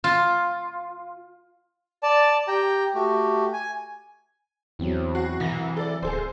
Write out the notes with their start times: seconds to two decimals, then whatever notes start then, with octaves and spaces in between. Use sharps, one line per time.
0.04 F4
2.03 D5 A5
2.48 G4 G5 A#5
2.95 A3 F#4 G4
3.53 G#5
4.79 E2 F#3 C4 E4
5.15 F#4 C7
5.40 C2 E3 A#6
5.77 A4 D5
6.03 D1 G#4 A4 C5